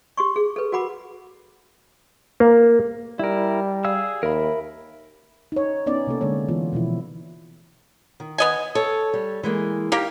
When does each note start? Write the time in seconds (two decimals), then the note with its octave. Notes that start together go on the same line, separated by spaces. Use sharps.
0.17 G4 C6 C#6
0.36 G#4
0.56 A4 B4
0.72 F#4 A#4 F#5 B5 D6
2.40 A#3
3.19 G3 E4 A#4
3.85 G#4 F5 E6
4.23 D#2 A#4 E5 B5
5.52 D#4 C#5
5.86 B3 C#4 D#4 D5
6.07 C3 A#3 A4
6.21 D3 G#3 A#3 C#5
6.48 E3 B3 F4
6.72 B2 E3 F3 E4
8.20 D#3
8.38 B3 D#5 G#5
8.75 A4 C#5
9.13 G3
9.43 E3 G#3 A#3
9.92 A#3 D#4 G4 A#4